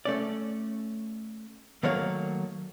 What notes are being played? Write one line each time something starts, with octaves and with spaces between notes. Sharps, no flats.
A3 C#4 D5
D#3 F#3 A3 A#3 C#5 F5